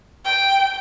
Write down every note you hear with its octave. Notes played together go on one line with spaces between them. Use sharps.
G5